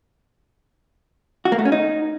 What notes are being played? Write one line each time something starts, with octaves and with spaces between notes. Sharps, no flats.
F#4
A#3
A3
C#4
D#4